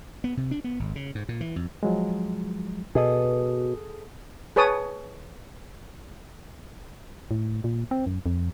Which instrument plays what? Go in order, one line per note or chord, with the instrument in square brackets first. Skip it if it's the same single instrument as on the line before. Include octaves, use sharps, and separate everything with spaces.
[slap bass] B3
C3
D4
B3
G#1
C#3
G#2
A#2
E3
F2
[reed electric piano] F3 F#3 G#3
[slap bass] B2 [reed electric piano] G#4 A4 D#6
[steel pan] G#4 B4 C#5 A5 D#6
[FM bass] A2
A#2
C4
F#2
F2